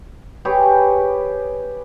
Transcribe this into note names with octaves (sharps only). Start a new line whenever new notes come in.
G4 G#4 B4 C#5